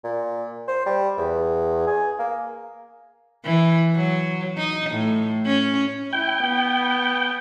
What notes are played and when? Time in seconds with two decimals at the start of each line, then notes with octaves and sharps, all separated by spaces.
0.04 A#2
0.68 C5
0.86 G3
1.17 E2
1.87 G#4
2.19 A#3
3.45 E3
3.95 F#3
4.58 D#4
4.90 A2
5.46 C#4
6.13 E4 G5
6.44 B3